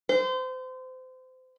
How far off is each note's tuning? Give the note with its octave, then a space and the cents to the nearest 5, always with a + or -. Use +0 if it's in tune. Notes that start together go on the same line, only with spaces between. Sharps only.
C5 -30